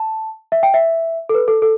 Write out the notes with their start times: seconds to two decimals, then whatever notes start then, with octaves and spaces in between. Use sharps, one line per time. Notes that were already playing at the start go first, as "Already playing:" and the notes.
Already playing: A5
0.52 E5
0.63 G5
0.74 E5
1.29 A4
1.34 B4
1.48 A4
1.62 A4